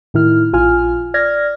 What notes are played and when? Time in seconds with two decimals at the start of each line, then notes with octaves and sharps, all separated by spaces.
0.14 A2 D#3 E4 F6
0.53 A#1 F4 G#5 F6
1.14 D5 F6 G#6 A#6